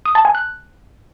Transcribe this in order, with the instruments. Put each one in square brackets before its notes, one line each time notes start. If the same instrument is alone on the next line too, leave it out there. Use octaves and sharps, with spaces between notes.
[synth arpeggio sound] D#6
A5
G#5
F#6